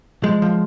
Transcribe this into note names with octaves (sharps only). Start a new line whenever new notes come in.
F3 G#3
F3